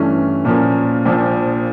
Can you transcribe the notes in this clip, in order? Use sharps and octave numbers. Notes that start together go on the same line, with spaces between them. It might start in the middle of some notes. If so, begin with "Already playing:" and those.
Already playing: G2 E3 A3 C#4
A#2 F3 A#3 C#4
A#1 A#2 F3